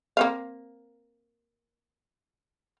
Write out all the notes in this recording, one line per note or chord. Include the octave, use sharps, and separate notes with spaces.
A#3 C4 F5